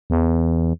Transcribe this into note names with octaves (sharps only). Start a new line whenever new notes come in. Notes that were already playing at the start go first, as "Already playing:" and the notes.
E2